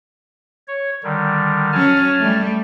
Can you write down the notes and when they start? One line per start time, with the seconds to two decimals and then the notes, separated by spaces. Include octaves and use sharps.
0.68 C#5
1.03 D3 D#3 G3
1.72 F#3 C#4 G#5 A5 F6
2.20 G3 A3